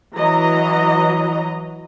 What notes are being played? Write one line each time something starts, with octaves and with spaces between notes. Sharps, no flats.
E3 F#3 D#5 A#5